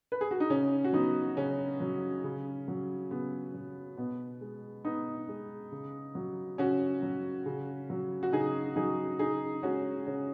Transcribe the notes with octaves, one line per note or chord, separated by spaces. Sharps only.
B4
G#4
F#4
D#4
C#3 C#4
F#4
F#3 B3 D#4
C#3 C#4
F#3
C#3
F#3
C#3 B3
F#3
B2 B3
G#3
B2 B3 D#4
G#3
C#3
F#3
C#3 C#4 F#4
F#3
C#3
F#3
F#4
C#3 D#4 G#4
F#3 D#4 G#4
C#3 D#4 G#4
G#3 C#4 F#4
C#3 C#4